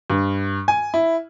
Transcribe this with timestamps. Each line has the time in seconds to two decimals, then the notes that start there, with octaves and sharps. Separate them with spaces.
0.10 G2
0.68 G#5
0.94 E4